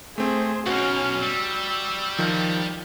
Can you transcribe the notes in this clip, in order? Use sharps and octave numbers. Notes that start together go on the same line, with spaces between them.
A3 C4 G#4 C5
B1 B2 C#4 F#4 F6
G3 E6
D#3 F3